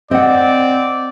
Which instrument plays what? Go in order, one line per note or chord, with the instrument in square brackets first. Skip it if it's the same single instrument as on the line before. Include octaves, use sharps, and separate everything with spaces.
[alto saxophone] C4 [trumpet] D5 [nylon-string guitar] D#5 F#5